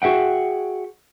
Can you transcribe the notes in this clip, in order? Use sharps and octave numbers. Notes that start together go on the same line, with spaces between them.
F#4 G#4 E5 F#5 G5